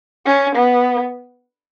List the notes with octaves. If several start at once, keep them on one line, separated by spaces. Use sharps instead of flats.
C#4
B3